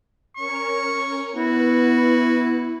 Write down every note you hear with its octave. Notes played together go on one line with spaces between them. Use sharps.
C#4 A#4 C#5 C#6
B3 E4 F#4 B4